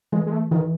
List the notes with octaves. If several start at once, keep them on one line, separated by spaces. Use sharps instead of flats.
E3 G#3
G#3
A3
D#3 E3